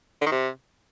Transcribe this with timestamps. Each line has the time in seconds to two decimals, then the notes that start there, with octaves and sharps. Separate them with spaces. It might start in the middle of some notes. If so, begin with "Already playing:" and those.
0.21 D3
0.27 D#3
0.32 C3